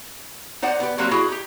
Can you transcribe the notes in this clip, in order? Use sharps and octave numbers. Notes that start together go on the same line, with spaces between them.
D#4 C5 D5 F#5
B3 G4
F#3 G3 A#3 C4 F#4 G4
E4 F#4 G#4
D#4 G4